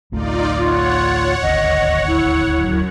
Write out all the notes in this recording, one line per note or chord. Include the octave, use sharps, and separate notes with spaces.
A1 D2 A3 D#4 F4 D5
F4 C#5 F#5
D#1 G#1 D2 D#5
E4
F#2